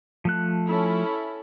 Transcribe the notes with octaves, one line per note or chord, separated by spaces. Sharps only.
F3 A3 F#6
C#4 E4 A4